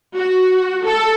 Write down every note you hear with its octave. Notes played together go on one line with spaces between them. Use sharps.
F#4
A4